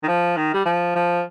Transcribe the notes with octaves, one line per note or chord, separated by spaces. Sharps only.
D#3
F3
D#3
G3
F3
F3